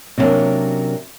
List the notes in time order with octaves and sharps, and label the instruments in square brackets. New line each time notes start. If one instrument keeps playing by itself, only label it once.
[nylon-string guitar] C3 F#3 G3 A#3 C#4 D4